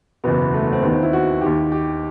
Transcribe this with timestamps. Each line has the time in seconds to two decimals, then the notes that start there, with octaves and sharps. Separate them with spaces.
0.24 F#1 E2 B2 B3
0.54 A3
0.63 B3
0.73 C4
0.82 D#2 D#3 B3
0.92 C4
1.03 E4
1.13 F#4
1.41 D#2 D#3 G4
1.72 G4